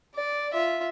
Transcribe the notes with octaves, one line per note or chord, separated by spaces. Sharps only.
D5
F4 E5